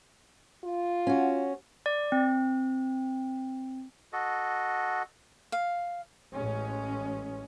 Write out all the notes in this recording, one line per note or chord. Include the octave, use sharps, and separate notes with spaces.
F4
C#4 F#4
D5
C4
F#4 A4 D#5
F5
A1 G#3 C#4